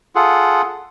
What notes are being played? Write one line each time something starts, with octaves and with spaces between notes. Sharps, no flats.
F4 G#4 A4 F#5